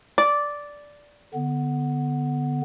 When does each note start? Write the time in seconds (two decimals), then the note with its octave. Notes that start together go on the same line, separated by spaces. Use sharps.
0.18 D5
1.34 D3 B3